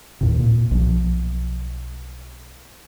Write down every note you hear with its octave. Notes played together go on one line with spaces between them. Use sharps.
D#2 A2 C3
A#2
B1 F3